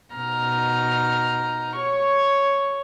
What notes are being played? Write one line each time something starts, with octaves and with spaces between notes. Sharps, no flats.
B2 D#4 A#5 F6
C#5 C#6